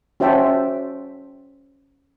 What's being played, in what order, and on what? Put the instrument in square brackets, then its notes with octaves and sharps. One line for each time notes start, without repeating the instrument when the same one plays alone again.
[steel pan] C#4 F#4 C5 E5 G5 A5